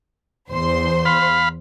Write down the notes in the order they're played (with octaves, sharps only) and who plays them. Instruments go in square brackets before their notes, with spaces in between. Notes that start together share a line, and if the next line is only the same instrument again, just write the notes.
[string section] E2 C5 C6
[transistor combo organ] F5 B5